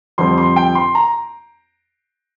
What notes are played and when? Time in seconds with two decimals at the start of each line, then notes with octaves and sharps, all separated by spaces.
0.18 F2 D3 G3 C4 C6
0.38 C6
0.56 G5
0.75 C6
0.95 A#5